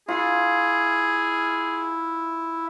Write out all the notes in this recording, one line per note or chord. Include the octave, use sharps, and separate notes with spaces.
E4 F4 G#4